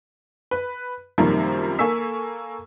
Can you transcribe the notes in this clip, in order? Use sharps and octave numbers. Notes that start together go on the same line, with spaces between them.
B4
F#2 C3 D#3 F3 G3 A#3
A#3 A4 G#5 C#6 E6 B6